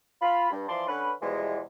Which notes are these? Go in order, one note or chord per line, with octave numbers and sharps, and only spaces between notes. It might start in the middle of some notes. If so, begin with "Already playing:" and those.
F4 B5
G2
E3 F3 D5 A5 C6
D3 C#4 B4
E2 B2 E3 F3 G3 G#3